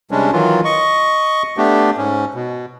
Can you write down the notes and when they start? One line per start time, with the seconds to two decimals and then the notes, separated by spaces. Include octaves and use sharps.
0.11 C3 G3 G#3 C#4 D4
0.32 D#3 E3 F#3 F4
0.65 D#5 C#6
1.57 A3 B3 D4 G4
1.97 G#2 C#4
2.34 B2